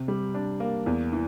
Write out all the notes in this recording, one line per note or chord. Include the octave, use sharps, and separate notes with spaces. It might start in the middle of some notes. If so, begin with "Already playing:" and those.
Already playing: C3
G3
D4
A#3
E2
E3